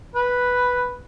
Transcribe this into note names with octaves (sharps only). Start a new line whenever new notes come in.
B4